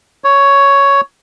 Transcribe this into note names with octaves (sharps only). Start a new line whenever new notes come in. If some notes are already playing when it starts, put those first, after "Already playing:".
C#5